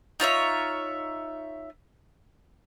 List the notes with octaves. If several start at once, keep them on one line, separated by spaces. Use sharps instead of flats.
D#4 F4 C#5 E5